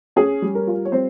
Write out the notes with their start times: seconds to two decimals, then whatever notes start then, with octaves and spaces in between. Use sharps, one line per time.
0.16 C#4 G#4
0.42 G3
0.55 A#4
0.67 F4
0.85 C#5
0.92 G3 C4 C5